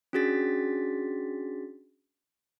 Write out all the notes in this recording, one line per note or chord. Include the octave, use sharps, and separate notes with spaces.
C#4 D4 F#4 G#4 A6 B6